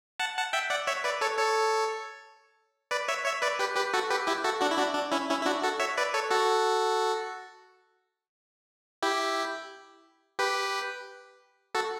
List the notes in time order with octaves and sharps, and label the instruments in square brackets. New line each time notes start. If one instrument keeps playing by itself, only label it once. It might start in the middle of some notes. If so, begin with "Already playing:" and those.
[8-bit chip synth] F#5 A5
F#5 A5
E5 G5
D5 F#5
C#5 E5
B4 D5
A4 C#5
A4 C#5
B4 D5
C#5 E5
C#5 E5
B4 D5
G4 B4
G4 B4
F#4 A4
G4 B4
E4 G4
F#4 A4
D4 F#4
E4
D4 F#4
D4
C#4 E4
C#4 E4
E4
D4 F#4
F#4 A4
C#5 E5
B4 D5
A4 C#5
F#4 A4
E4 G4
G4 B4
F#4 A4